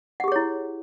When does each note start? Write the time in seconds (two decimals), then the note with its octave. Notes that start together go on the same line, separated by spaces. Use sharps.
0.20 F#5
0.24 G4
0.28 G#4
0.32 C#5
0.36 E4